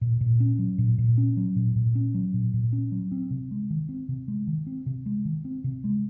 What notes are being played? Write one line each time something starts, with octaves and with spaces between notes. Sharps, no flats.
A#2
A#2
C#4
F#3
A#2
A#2
C#4
F#3
A#2
A#2
C#4
F#3
A#2
A#2
C#4
F#3
C4
C3
G#3
D#3
C4
C3
G#3
D#3
C4
C3
G#3
D#3
C4
C3
G#3